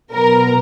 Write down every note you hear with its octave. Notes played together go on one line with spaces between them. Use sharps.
B2 F#3 B3 A#4